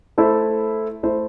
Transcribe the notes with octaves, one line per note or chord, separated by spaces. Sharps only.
A3 E4 A4 C5
A3 E4 A4 C5